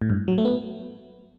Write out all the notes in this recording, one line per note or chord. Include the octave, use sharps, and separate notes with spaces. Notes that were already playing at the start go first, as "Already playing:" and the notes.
A2
G2
F#3
A3
B3